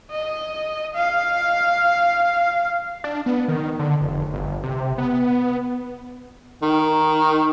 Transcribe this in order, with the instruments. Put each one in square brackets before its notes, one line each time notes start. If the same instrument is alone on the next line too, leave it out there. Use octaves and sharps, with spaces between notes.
[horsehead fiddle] D#5
F5
[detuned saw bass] D4
B3
D#3
D3
F1
G1
C3
B3
[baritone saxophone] D#3